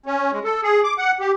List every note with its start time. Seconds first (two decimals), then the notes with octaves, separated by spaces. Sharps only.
0.06 C#4
0.32 G#3
0.44 A4
0.63 G#4
0.84 D6
0.98 F#5
1.20 G4